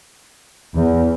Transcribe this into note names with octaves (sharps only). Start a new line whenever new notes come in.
E2